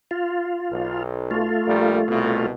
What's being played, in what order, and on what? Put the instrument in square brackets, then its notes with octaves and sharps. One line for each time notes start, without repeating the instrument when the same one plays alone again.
[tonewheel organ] F4
[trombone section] B1
[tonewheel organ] A3 F4
[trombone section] A#1 G3 A#4
C2 B2